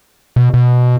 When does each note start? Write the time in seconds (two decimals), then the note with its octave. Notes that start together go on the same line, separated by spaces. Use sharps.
0.36 B2
0.54 B2